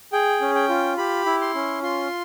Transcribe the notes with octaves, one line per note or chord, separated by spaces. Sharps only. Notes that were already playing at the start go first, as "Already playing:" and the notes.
G#4 G5
C#4
G5
F4
G4 B5
E4
C6
C#4
F4 C6